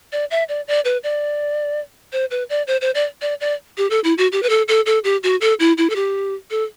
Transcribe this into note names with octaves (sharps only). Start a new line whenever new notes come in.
D5
E5
D5
D5
B4
D5
C5
B4
D5
C5
C5
D5
D5
D5
G4
A4
E4
F#4
G4
B4
A4
A4
A4
G4
F#4
A4
E4
E4
A4
G4
A4